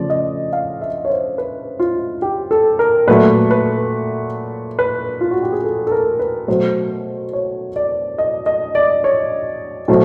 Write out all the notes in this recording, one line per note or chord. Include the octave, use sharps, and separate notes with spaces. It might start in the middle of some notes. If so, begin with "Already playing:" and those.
Already playing: C#3 F3 A3 D5
D#5
F5
E5
C#5
C5
B4
F4
G4
A4
A#4
A#2 F#3 A3 B4
B4
B4
F4
F#4
G4
G#4
A4
A4
A#4
B4
B2 F#3 A3 C5
C#5
D5
D#5
D#5
D5
C#5
B2 F#3 A3 C5